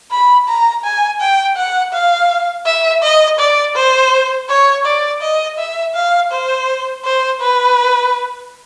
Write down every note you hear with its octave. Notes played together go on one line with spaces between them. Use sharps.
B5
A#5
G#5
G5
F#5
F5
E5
D#5
D5
C5
C#5
D5
D#5
E5
F5
C5
C5
B4